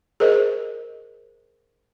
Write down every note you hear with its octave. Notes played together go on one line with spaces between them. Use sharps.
G#4 A#4 C5 D#5